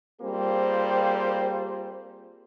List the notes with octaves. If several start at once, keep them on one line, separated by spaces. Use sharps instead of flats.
G3 A#3 C4 F4 G#4 C5